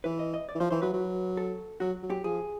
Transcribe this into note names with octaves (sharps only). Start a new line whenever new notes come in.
E3 B4
D#5
D#5
D5
E3
F3 C5
E3 C5
F#3 B4
F#3
A4
F#3 F#4
F#3
G4
F3 G#4